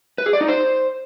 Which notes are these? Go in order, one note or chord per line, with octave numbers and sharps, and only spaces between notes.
B4
G#4
D5
D#4
C5